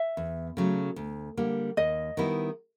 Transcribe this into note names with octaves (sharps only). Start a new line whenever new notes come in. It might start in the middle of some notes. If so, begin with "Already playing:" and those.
Already playing: E5
E2
C#3 F#3 A3
D2
D3 G3 A#3
D#2 D#5
D#3 G3 B3 E4